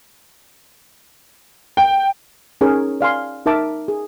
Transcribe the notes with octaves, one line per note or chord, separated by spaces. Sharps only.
G5
C#4 D#4 G#4 A#4 C#5
D5 F5 G#5 C6
D#4 A#4 E5 A5 D6
G#4